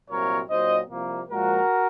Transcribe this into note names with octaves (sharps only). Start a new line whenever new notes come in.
C2 A#2 F#3 C4 F4 A#4 C#5
A#2 F#3 C4 D#4 C5 D#5
C2 C3 F3 A#3
A#2 F3 G#3 F#4 A#4